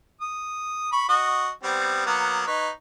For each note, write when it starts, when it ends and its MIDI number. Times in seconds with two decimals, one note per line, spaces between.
0.21 0.89 87
0.92 1.06 83
0.92 1.06 85
1.09 1.49 66
1.09 1.49 75
1.63 2.01 55
1.63 2.01 59
1.63 2.01 60
2.06 2.45 54
2.06 2.45 58
2.06 2.45 59
2.47 2.68 63
2.47 2.68 71
2.47 2.68 73